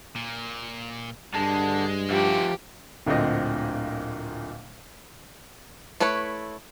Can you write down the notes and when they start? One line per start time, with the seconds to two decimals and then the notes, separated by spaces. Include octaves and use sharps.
0.15 A#2
1.34 G2 D3 G#3 A5
2.10 F3 F#4 G4 D5 E5
3.06 D1 A#2 D3 A3 C4 D#5
6.00 A3 E4 B4 C#5 B5